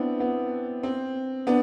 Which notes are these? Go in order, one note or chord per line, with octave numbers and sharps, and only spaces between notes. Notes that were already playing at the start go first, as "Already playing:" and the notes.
Already playing: B3 C4 D4 E4
B3
C4
B3 D4